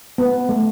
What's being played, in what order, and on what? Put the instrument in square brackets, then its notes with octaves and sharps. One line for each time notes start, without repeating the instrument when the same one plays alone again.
[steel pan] B3
A3